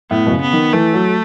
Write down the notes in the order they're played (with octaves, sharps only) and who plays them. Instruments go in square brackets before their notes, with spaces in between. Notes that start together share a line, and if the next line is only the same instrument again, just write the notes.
[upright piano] A2 [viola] B3
[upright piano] B2
C#3
[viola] B3
[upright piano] D#3
[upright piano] E3 [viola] A3
[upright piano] F#3